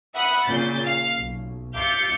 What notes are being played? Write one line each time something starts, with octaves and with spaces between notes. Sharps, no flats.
E5 F#5 B5 D#6 F#6
A#2 C#3 G6 A6
F5 F6
B1
E5 F5 D6 G6 A6 C#7